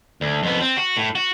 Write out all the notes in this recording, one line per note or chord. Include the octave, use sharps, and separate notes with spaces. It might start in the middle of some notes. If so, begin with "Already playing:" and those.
D2
F2 B3
C4
F#4
A2
F#4